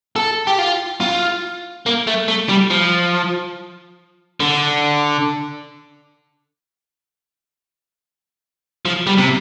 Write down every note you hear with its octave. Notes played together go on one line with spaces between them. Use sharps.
A4
G4
F4
F4
A#3
A3
A3
G3
F3
D3
F3
G3
C3